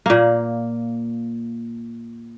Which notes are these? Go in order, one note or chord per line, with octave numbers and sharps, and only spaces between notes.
A#2 A#3